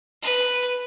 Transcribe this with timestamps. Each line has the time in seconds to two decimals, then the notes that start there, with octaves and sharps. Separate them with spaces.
0.22 B4